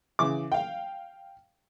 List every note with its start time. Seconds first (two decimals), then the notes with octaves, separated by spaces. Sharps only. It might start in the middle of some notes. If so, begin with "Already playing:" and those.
0.19 C#3 E3 D6
0.52 F5 G5